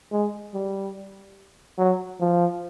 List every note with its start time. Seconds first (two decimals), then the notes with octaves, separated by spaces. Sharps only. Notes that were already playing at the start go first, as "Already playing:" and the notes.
0.12 G#3
0.54 G3
1.78 F#3
2.20 F3